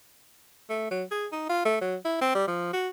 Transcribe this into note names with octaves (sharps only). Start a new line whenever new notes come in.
A3
F#3
G#4
D#4
F4
A3
F#3
E4
C4
G3
F3
F#4